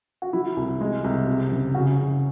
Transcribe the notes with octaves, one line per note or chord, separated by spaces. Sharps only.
F#4
F#3 E4
C2
G#3
C2
C3
F#1
C#3 F#4
C#3